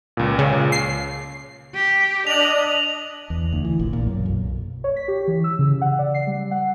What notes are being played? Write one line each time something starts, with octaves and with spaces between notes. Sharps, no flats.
C#2 A#2
C#3
C7
G4
D4 D#5 F7 F#7
E2
D2
E3
A#1
A#2
F#2
B1
C#5
B6
G4
E3
E6
C#3
F#5
D5
C7
G3
F#5